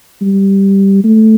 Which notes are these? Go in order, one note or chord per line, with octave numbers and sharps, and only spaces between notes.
G3
A3